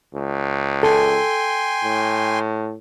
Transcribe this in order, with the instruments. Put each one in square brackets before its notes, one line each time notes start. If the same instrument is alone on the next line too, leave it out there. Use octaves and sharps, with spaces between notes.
[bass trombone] C#2
[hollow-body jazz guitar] A4 [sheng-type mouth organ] G5 G#5 C6
[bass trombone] A2